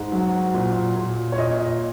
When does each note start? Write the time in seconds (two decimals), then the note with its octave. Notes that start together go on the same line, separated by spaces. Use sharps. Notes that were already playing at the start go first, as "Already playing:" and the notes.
Already playing: G#2
0.12 F#3
0.54 A#2
0.96 A#2
1.32 C#5
1.38 A#2 D#5
1.59 D#5